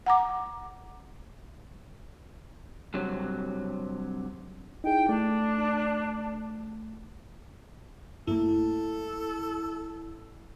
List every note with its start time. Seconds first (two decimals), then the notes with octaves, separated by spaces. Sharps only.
0.06 F#5 A#5 D6
2.94 G2 C3 F#3
4.84 D#4 E4 G#4 G5
5.09 A3 D4
8.27 G2 A3 A#3 E4 A4